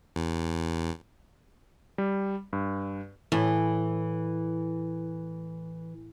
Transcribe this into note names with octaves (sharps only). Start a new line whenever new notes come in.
E2
G3
G2
A2 E3